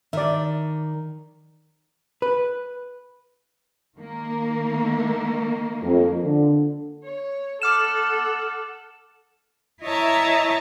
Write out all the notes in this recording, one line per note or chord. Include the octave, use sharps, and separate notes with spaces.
D#3 D5 E5
B4
D#3 A#3
F2
D3
C#5
A4 F#5 D6 F6 E7
E4 C#5 D#5 E5 A5 A#5